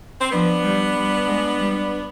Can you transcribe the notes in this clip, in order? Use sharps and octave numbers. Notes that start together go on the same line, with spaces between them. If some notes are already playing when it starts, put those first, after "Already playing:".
C4
F3 B3 D4
G3
G3
G#3
G3